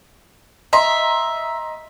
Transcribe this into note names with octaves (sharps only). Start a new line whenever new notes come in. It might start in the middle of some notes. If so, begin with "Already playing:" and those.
D#5 E5 A#5 C6